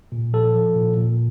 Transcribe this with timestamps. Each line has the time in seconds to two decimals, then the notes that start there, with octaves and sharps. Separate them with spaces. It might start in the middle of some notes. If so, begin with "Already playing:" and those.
0.12 A#2
0.33 F3 A4
0.55 F3
0.76 A#2
0.97 A#2